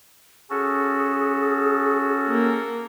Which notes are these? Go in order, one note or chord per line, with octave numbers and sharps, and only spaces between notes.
C#4 F#4 G#4 A4
A#3